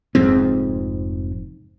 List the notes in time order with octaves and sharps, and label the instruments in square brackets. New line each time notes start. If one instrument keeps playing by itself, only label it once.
[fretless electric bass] F1 F2 G#2 C4